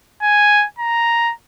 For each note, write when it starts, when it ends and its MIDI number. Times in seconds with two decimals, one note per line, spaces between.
0.22 0.65 80
0.79 1.33 82